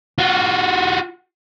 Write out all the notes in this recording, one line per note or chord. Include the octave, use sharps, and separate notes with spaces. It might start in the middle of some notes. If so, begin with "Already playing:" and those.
F4 F#4